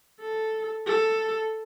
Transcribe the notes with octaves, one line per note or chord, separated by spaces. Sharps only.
A4
A4